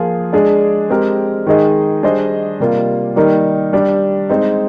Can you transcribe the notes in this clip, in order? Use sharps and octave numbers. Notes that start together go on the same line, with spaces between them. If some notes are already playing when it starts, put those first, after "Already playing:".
Already playing: F3 A#3 F4 G#4
G#3 D4 G#4 D5
G#3 C4 G4 A#4
D#3 G#3 D#4 G#4 D#5
G3 D4 G#4 C5 D#5
C3 G3 A#3 F4
D#3 G3 A#3 D#4 A#4
G3 D4 G4
G#3 C4 D#4